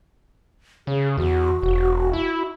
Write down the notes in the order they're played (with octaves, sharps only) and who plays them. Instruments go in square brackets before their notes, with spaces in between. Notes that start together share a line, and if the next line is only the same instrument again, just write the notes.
[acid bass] C#3 [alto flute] G#4
[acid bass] E2 [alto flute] F#4
[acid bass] E1
E4